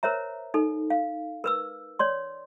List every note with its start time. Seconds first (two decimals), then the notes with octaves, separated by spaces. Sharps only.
0.03 A#4 C5 C#5 E5 A#5
0.54 D#4 A4
0.90 F5
1.44 A#4 B4 E6
1.99 C#5 D5 C6